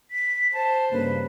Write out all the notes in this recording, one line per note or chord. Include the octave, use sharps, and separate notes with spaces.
B6
C5 A5
G2 C#3 A#3 B4